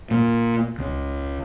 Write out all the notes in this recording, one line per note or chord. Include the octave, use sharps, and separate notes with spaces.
A#2
C#2